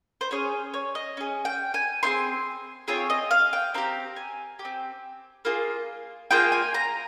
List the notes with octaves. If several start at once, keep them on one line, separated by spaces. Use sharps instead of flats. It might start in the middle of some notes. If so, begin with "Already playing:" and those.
C5
C#4 G#4 C#5
C#5
D#5
C#4 G#4
G5
G#5
C4 F4 G#4 C6
C4 F4 G#4 C#5
D#5
F5
G5
C4 G4 A#5
G#5
G4
C4
A#3 F4 G#4
A#3 F4 G#4 G5
G#5
A#5